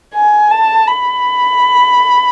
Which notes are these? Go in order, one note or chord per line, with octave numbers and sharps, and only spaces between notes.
G#5
A5
B5